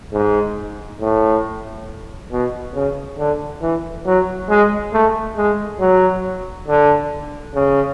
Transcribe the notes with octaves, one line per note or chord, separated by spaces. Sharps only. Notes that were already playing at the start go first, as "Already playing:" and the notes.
G#2
A2
B2
C#3
D3
E3
F#3
G#3
A3
G#3
F#3
D3
C#3